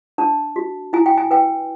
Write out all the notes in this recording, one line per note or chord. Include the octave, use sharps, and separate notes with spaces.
D4 A5
F#4
E4 G#5
G5
G#5
B4 G5